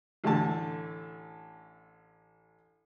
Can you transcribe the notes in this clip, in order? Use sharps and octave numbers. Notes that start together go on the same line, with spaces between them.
A1 D3 A3 A5